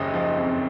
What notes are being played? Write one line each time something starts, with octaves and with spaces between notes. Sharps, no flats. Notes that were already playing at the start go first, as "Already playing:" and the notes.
Already playing: F#1 D#2 C#3 D#5 D#6
F3
F2